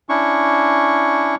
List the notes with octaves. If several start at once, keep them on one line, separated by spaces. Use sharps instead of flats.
C#4 D4 E4 C#6